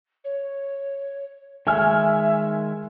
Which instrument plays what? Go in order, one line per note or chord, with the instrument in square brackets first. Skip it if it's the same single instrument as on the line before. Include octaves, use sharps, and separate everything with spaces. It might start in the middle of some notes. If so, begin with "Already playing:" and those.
[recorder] C#5
[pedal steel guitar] D#3 G#3 C#5 [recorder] E5 [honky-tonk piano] G#5 F6